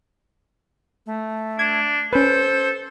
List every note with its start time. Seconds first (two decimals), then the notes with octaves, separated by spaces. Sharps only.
1.06 A3
1.59 D4 G#6
2.13 C#4 A4 B4 C5